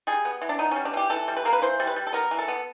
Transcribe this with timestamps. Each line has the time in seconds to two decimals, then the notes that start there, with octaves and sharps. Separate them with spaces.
0.07 G3 G#4
0.25 B3
0.42 E3
0.49 D4
0.59 B3 D#4
0.71 G3 C#4
0.85 D4
0.93 E3 G4
1.10 E3 A4
1.28 G3
1.37 B4
1.45 A#3 A#4
1.53 B4
1.62 E3 C5
1.80 G3
1.87 B4
1.96 G3
2.07 A4
2.13 B3 A#4
2.31 E3
2.39 A4
2.48 B3